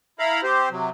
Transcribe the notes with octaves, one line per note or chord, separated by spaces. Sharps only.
E4 F5 A#5 B5
C4 G4 C5
C3 F#3